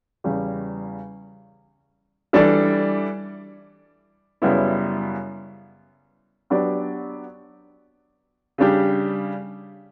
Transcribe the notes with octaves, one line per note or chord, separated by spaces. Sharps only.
E2 C#3 G3
E3 G3 D4 A4 D5
F#2 C#3 G3 B3 E4
F#3 B3 D4 G4 D5
C#3 G3 D4 G4